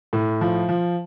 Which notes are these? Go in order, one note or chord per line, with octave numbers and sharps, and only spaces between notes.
A2
F3
F3